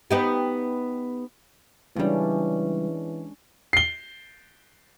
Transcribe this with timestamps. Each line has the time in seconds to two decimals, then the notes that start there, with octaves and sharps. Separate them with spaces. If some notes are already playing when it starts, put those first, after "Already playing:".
0.11 B3 D#4 G4
1.96 C#2 E3 G3 G#3 C#4 D4
3.73 C7 G7